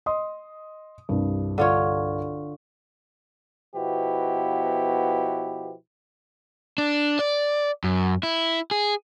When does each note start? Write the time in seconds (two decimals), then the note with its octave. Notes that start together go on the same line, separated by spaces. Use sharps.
0.06 D#5 C6 D#6
1.09 C2 G2
1.58 D3 F4 C#5
3.75 B2 F3 B3 E4 F#4 G4
6.78 D4
7.19 D5
7.84 F#2
8.23 E4
8.71 G#4